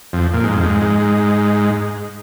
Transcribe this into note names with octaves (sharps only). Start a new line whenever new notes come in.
F2
A#2
G#2
F2
G#2